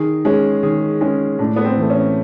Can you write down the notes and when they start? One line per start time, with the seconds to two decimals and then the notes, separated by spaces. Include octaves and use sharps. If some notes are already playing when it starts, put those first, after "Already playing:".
Already playing: D#3 G#4
0.25 G#3 C#4
0.63 D#3 G#4
1.01 G#3 C#4
1.39 A2 D4
1.56 B3
1.64 C4
1.77 E3 A3
1.90 C#4